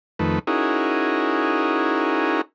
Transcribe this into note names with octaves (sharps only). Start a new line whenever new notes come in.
F2 D#3 A3 B4
C#4 D#4 E4 F#4 G#4 A#4